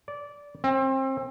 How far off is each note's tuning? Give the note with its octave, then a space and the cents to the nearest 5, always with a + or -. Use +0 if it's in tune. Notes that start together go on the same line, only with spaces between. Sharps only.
D5 -15
C4 +30